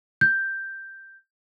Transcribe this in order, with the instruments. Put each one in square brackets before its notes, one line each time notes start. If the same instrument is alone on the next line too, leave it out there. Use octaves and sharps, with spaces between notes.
[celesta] G6